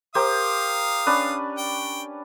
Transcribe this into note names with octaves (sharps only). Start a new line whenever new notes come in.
G4 A#4 C5 F5 D#6
C#4 D4 B4
G5